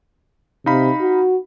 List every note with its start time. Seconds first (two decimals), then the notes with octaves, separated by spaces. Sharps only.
0.66 C3 D#4 F5 B5
1.01 F#4